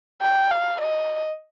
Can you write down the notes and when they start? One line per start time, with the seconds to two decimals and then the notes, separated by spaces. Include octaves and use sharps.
0.22 G5
0.51 F5
0.81 D#5